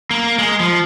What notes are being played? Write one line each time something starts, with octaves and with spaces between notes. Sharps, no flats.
A#3
G#3
F3